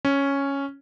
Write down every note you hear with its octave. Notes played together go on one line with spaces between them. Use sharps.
C#4